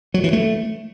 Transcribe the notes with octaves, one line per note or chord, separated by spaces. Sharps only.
F#3
E3
A3